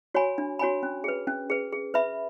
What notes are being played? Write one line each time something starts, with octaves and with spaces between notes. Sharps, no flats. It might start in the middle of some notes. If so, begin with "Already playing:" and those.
F#4 C#5 G#5 B5
D4
F#4 C#5 G#5 B5
C#4
G#4 B4
C#4
G#4 B4
G#4
B4 E5 B5